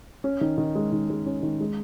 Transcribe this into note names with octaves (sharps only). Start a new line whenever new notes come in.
C#4
D#3
D#3
G#3
D#3
G#3
C#4
D#3
G#3